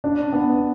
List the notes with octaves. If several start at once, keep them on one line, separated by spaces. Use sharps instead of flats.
D4
B3